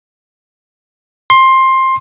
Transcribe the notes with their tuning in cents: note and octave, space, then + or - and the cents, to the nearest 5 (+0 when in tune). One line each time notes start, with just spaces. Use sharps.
C6 +15